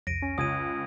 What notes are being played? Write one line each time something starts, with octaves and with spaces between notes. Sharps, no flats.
C2 F2 A#6 D7 D#7
C#4
C#2 D#6 G#6 D#7